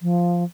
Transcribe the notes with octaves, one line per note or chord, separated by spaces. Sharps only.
F3